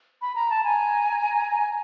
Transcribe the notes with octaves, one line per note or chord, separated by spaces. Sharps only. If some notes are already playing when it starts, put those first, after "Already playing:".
B5
A#5
A5
G#5 A#5